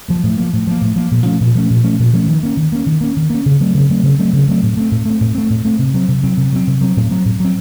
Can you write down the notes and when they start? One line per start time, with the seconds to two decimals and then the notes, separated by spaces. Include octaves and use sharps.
0.08 F3 A#3
0.24 A2
0.37 F3 A#3
0.53 A2
0.67 F3 A#3
0.81 A2
0.96 F3 A#3
1.11 A#2
1.25 F3 A3 C#4
1.40 A#2
1.54 F3 A3 C#4
1.70 A#2
1.84 F3 A3 C#4
1.99 A#2
2.13 F3 A3 C#4
2.28 D#3
2.43 A#3 C#4
2.57 D#3
2.72 A#3 C#4
2.86 D#3
3.01 A#3 C#4
3.16 D#3
3.30 A#3 C#4
3.46 C#3
3.60 F#3 A3 C4
3.74 C#3
3.90 F#3 A3 C4
4.03 C#3
4.19 F#3 A3 C4
4.33 C#3
4.48 F#3 A3 C4
4.63 A2
4.77 A3 C4
4.91 A2
5.05 A3 C4
5.21 A2
5.35 A3 C4
5.50 A2
5.65 A3 C4
5.79 C3
5.94 F#3 C4
6.08 C3
6.23 F#3 C4
6.37 C3
6.52 F#3 C4
6.67 C3
6.81 F#3 C4
6.97 A2
7.11 F#3 C4
7.25 A2
7.40 F#3 C4